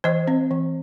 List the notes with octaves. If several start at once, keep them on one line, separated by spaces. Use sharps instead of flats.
E3 C5 D#5
C4
E3